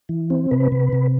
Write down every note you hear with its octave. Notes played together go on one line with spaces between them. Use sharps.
E3
C4
C3 B4
C3
C3